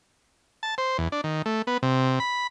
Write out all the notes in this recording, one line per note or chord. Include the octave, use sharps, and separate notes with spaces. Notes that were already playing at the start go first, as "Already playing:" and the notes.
A5
C5
E2
D4
D#3
A3
B3
C3
B5